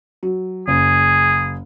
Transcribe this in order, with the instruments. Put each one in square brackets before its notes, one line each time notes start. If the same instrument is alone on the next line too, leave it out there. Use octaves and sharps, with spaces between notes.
[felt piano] F#3
[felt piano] F#1 [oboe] G#4